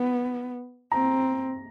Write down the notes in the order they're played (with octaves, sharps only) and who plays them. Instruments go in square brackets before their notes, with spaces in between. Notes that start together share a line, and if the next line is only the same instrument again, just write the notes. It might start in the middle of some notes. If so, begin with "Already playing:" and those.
Already playing: [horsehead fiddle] B3
[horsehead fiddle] C4 [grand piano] A#5